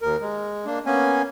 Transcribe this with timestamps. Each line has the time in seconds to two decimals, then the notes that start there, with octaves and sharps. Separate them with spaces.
0.02 D#2 A#4
0.21 G#3
0.66 A#3 D4
0.86 A#3 B3 C#4 G#5